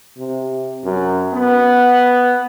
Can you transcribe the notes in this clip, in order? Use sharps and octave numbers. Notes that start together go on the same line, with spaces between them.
C3
F#2
B3